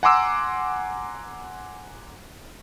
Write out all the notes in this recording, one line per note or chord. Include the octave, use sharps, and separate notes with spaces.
F#5 G#5 A#5 C6 D6 E6